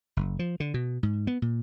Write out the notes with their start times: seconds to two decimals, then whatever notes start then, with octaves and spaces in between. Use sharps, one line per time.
0.17 F#1
0.39 F3
0.60 D3
0.74 B2
1.03 G#2
1.27 B3
1.42 A#2